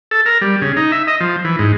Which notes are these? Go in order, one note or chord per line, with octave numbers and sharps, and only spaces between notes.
A4
A#4
G3
C#3
D#4
E5
D#5
F3
E3
G#2